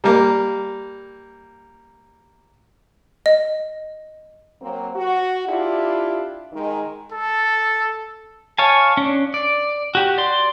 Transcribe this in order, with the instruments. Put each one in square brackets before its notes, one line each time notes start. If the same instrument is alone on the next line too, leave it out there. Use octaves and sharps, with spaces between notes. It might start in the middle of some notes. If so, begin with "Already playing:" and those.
[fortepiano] G3 A#3
[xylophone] D#5
[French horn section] F#3 A#3 C4
F#4
D4 E4 F4 G4
D#3 G#3 D#4
[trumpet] A4
[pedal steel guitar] C#5 F5 G#5 A5
C#4 D4
D5
F#4 G4
D5 C6